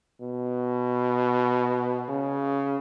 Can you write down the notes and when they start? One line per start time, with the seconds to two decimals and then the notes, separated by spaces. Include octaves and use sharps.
0.21 B2
2.09 C#3